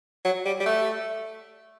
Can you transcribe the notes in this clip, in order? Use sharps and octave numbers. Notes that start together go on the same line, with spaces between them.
F#3
G3
G3
A3